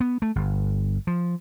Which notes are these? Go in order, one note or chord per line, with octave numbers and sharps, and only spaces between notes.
B3
A3
G1
F3